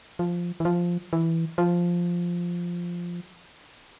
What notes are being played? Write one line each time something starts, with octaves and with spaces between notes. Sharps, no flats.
F3
E3
F3
E3
F3